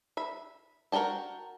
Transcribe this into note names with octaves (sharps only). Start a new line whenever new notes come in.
E5 B5
F#4 A#4 D#5 G5 A5